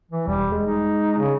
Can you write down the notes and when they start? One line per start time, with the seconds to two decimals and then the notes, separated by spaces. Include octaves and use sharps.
0.11 E3
0.27 E1 G3
0.52 G#3
0.65 D#4
1.18 C#3